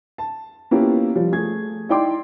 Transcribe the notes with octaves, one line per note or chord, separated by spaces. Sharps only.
A5
A#3 B3 C#4 E4 F4 G4
F3 G3
A3 G#4 G#6
D#4 E4 D5 G5 C6 D6